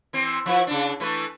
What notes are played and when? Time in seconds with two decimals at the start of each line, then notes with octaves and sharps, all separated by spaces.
0.13 E3 C4
0.46 F3 E4 B4
0.67 C#3 D4
1.00 E3 A3 B4